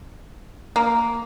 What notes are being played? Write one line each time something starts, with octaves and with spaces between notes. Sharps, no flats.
A#3